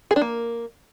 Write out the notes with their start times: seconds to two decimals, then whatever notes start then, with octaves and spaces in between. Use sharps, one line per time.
0.11 G#4
0.16 D4
0.21 A#3